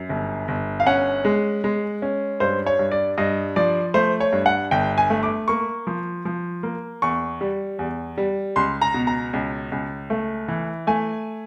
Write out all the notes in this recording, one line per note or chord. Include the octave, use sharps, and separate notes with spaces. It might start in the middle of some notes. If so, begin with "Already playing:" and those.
Already playing: F#2
G1
G1
F5
C#4 F#5
G#3
G#3
C#4
G2 C5
C#5
G2
D5
G2 D#5
F3 D5
A3 C5
C#5
G2
F#5
G1 G5
G#5
A3
D6
A#3 C#6
F3
F3
A#3
E2 C#6
G3
E2
G3
C#2 C6
A#5
B2
A#5
C#2
C#2
A3
E3
A3 G#5